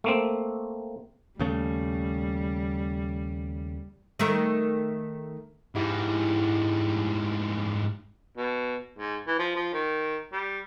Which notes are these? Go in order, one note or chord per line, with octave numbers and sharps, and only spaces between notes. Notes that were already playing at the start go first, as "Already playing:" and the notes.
A3 A#3 C4
D#2 C#3 G3 A3
D#3 A3 A#4
G#2 G3 E4 G4
B2
G#2
E3
F3
F3
D#3
G3